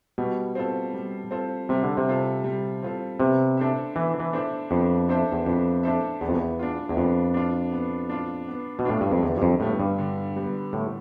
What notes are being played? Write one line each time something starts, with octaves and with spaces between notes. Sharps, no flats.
B2 G3
C4 F4 A4
G3
C4 F4 A4
C3 G3
D3
C3
C4 F4 A4
G3
C4 F4 A4
C3 B3
D4 A4 C5 E5
E3 B3
E3
D4 A4 C5 E5
F2 B3
D4 A4 C5 E5
E2
F2 B3
D4 A4 C5 E5
E2 B3
F2
E2
D4 F4
E2
F2 B3
D4 F4
B3
D4 F4
B3
B2
A2 D4 F4
G2
F2
E2 D3
G2
F2
A2 G3 B3
G2
D3
G3 B3
A2 D3